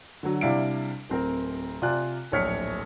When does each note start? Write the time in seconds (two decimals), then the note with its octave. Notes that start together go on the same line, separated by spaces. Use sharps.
0.23 D3 F#3
0.41 C3 G3 D4 E4 F5 D7
1.10 D1 C4 A#4
1.82 C3 F4 D5 G#5 F#6
2.32 D1 A#1 C#5 F6 B6 C#7